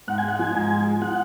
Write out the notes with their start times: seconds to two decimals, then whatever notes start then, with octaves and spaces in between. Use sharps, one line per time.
0.08 G#2 F#5
0.18 G#5
0.23 G#3
0.28 F#5
0.39 F3 G#5
0.55 G#2
0.71 G#3
0.87 G#3
1.02 F3 F#5